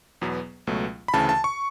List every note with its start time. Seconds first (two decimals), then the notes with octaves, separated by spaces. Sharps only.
0.21 E2 B2 F#3 B3
0.67 C#2 B2 F#3 A3
1.08 B5
1.14 D2 C#3 E3 A5
1.29 A5
1.44 C#6